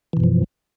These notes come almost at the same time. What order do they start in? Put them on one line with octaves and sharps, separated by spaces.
E3 B2 F#2 F3